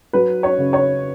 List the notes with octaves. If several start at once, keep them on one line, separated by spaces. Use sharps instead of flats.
F#3 B4
C#5
C#3
C#5